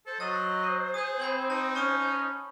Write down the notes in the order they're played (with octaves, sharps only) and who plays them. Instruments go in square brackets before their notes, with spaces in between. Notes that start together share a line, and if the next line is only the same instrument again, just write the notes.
[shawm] A4 [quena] C5
[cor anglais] F#3 [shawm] D#5 [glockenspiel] E6 A6
[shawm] G#4 [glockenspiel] D#6 G6
[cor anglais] C4 [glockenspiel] B5 G#6 F#7
[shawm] D#4 [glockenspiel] A5
[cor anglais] C#4 [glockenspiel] A5 C#6 D#6